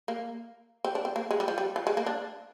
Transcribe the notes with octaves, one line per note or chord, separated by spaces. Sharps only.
A#3
C4
D4
C4
A#3
G#3
G3
F3
G3
F3
G#3
A#3
D4